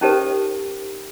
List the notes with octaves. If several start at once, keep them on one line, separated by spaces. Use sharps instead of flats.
C#4 D#4 G4 A4 A#4 C5